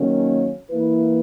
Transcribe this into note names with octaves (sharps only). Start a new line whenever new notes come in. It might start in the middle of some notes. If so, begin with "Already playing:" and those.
Already playing: D#3 F#3 A#3 C#4
E3 A#3 E4 B4